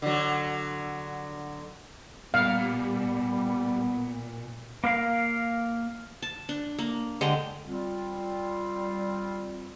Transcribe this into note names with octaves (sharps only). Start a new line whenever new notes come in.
D3 F#3
A#2 G3 B3 F5
A#3 A#4 F5
A5
D4
A#3
D3 G#3 G4 A#5
G3 C4 F4